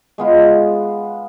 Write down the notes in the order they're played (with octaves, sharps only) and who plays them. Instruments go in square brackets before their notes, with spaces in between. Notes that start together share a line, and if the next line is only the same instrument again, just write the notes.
[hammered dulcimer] G#3 B3 F4